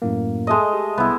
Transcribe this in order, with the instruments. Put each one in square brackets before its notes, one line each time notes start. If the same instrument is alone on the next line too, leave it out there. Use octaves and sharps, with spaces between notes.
[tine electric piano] F#2 A2 A#3
[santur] G#3 A3 D#5
[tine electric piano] G4
[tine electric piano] C2 [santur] B3 E4